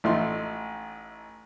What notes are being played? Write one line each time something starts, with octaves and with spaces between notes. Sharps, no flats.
A1 A3 D#4 C6